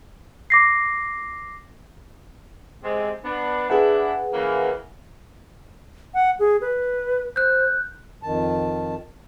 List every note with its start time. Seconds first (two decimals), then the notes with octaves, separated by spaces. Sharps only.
0.50 D6 A#6 C7
2.84 C3 G#3 C4
3.25 B3 D4
3.70 D4 E4 G#4 B4 F#5
4.34 C#3 E3 A#3
6.14 F#5
6.39 G#4
6.61 B4
7.36 C5 F#6 G6
8.23 F2 D#3 A5